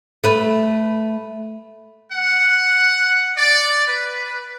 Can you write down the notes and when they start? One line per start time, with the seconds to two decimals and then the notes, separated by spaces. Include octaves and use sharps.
0.24 A3 B4
2.11 F#5
3.37 D5
3.87 B4